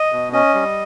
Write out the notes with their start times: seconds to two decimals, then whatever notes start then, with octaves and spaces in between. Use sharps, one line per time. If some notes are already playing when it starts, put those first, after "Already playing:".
Already playing: D#5
0.13 B2
0.33 C#4 D#5
0.54 G3